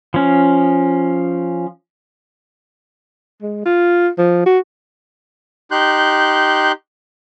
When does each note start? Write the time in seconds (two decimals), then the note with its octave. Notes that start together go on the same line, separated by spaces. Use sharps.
0.14 F3 C#4
3.42 G#3
3.65 F4
4.18 F3
4.46 F#4
5.71 D#4 G4 C6 F#6 G6